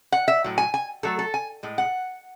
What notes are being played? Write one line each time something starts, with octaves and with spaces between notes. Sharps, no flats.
F#5
E5
A2 F#3
G#5
G#5
B2 F#3 A3 A4
A4
G#5
A2 G#3
F#5